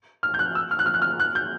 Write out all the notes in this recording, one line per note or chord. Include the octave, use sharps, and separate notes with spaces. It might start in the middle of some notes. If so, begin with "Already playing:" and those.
F6
G6
F#6
E6
F6
F#6
F6
F#6
F6
F#6
G6